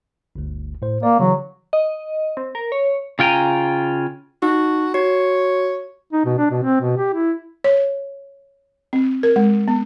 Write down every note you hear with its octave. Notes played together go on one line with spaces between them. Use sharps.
G1 D2
A2 C5
A#3 D5
C#3 E3 F#3
D#5
C4
A#4
C#5
C#3 F4 G5 G#5 A#5
D#4 F#4
F#4 C#5
D#4
B2
D4
B2
C4
B2
G4
E4
C#5
C4
A#4
G#3
B3